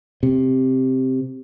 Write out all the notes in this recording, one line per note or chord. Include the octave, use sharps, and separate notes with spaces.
C3